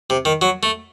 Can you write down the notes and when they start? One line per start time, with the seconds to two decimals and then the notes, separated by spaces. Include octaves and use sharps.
0.10 C3
0.25 D#3
0.42 F#3
0.63 A3